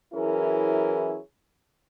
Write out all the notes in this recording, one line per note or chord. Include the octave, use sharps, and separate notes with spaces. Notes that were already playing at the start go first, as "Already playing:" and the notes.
E3 F#3 C#4 E4 G#4 A#4